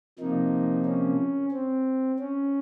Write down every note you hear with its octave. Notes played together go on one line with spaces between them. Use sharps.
C3 F3 A#3 D#4
C#4
C4
C#4